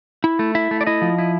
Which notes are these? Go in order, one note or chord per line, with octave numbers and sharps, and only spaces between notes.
E4
A3
E4 E5
A3
D5
E4 D#5
F3
E4